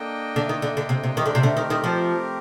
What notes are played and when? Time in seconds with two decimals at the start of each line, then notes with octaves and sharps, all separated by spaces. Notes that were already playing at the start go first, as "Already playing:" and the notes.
Already playing: A#3 D4 A4 D#5 G5
0.36 D3
0.49 D#3
0.62 D3
0.77 D3
0.89 C3
1.04 C3
1.17 D#3 A3 C4 G4 A#4
1.26 D3
1.35 C3
1.43 D3
1.57 D#3
1.70 D#3
1.84 F3